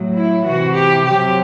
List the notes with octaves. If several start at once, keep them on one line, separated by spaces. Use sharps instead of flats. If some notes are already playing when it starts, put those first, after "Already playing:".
Already playing: A2 F#3
E4
C3 E3 F#4
G4
C3 F#3 G4